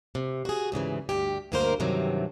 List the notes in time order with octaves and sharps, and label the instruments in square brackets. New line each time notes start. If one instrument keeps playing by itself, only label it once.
[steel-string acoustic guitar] C3
F#4 G#4
D2 G#2 C#3 E3
D2 G2 G4
D2 G2 D#3 A#3 A#4 C5
G2 C3 D#3 E3 F#3